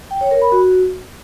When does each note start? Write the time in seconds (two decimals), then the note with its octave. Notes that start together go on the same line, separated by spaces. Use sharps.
0.11 G5
0.21 C#5
0.31 A#4
0.42 B5
0.52 F#4